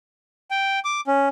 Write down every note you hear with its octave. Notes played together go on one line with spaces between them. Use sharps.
G5
D6
C#4